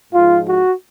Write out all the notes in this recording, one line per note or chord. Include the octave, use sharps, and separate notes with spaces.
G#2 F3 F4
F#4